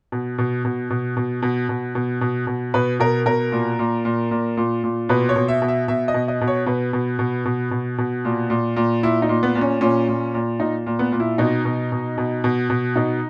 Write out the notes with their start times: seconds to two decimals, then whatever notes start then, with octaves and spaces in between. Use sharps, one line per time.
0.12 B2
0.38 B2
0.65 B2
0.90 B2
1.17 B2
1.42 B2
1.69 B2
1.95 B2
2.21 B2
2.47 B2
2.74 B2 B4
3.00 B2 A#4
3.26 B2 A#4
3.52 A#2
3.79 A#2
4.05 A#2
4.31 A#2
4.57 A#2
4.84 A#2
5.09 B2 B4
5.29 C#5
5.36 B2
5.48 E5
5.62 B2
5.68 E5
5.88 B2 E5
6.08 D#5
6.14 B2
6.28 D#5
6.41 B2
6.48 C#5
6.66 B2 B4
6.93 B2
7.19 B2
7.45 B2
7.71 B2
7.98 B2
8.25 A#2
8.50 A#2
8.76 A#2
9.03 A#2 E4
9.22 D#4
9.29 A#2
9.43 B3
9.55 A#2
9.61 C#4
9.81 A#2 C#4
10.08 A#2
10.34 A#2
10.60 A#2 D#4
10.87 A#2
10.99 B3
11.12 A#2
11.20 E4
11.38 B2 D#4
11.65 B2
11.92 B2
12.18 B2
12.44 B2
12.70 B2
12.96 B2 D#4